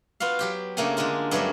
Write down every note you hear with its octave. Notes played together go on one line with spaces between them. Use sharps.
B3 F4 F#4 F5
F#3 G4 G5
C#3 A3 A#3 D4 G5 G#5
D3 G#3 D4 F4
G2 F#3 A3 A#3 C#4 D4